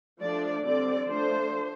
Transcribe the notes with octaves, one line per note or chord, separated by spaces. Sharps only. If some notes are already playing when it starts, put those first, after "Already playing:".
F3 A3 D4 D5
D3 G3 C4 D5
F3 A3 D4 C5